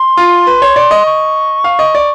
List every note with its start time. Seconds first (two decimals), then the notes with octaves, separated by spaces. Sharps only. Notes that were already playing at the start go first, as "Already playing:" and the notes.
Already playing: C6
0.17 F4
0.47 B4
0.62 C#5
0.76 D5
0.91 D#5
1.06 C#6
1.64 F5
1.79 D#5
1.95 D5